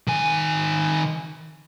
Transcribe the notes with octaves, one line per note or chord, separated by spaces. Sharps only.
D#3 G#5